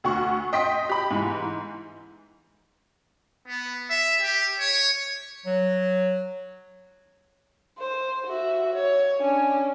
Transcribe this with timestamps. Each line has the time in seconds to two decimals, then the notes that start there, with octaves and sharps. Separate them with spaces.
0.04 D2 F#4 F#5 C#6
0.53 D#5 G5 C6 B6
0.89 G4 B5
1.11 G#2 E3
3.47 B3
3.90 E5
4.22 G4
4.59 C#5
5.46 F#3
7.79 C5
8.27 F#4 E5
8.74 C#5
9.19 C#4 D4